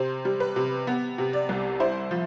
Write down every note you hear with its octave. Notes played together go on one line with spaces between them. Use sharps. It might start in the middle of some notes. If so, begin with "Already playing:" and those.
Already playing: C3 C5
G3
B4
C3
B3
C3
D5
C2
E4 C5
F3